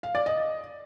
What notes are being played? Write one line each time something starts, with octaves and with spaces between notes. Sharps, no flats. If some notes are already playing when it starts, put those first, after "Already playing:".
F5
D5
D#5